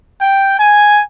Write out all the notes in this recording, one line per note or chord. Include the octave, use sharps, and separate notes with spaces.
G5
G#5